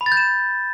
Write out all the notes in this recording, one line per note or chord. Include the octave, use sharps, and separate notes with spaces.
B5
A6
G6
E7